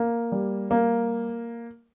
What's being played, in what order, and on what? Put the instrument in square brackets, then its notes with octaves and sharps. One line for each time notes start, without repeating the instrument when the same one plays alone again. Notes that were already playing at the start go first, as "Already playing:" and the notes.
Already playing: [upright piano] A#3
G3
A#3